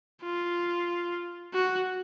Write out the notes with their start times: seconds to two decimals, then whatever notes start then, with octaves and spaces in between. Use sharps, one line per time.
0.22 F4
1.54 F#4